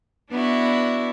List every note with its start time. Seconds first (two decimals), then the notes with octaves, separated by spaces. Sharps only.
0.31 B3 D4 E4 F#4